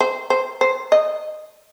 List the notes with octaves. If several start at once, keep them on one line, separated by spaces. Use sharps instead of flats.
C5
C5
C5
D#5